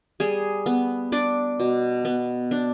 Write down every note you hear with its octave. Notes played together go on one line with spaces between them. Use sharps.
G3 G#4
B3
D4 D5
B2
B3
D4